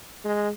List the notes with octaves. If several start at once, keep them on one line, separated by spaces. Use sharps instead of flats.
G#3